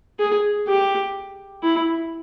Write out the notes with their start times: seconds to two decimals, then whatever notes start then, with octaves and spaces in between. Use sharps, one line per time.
0.19 G#4
0.68 G4
1.63 E4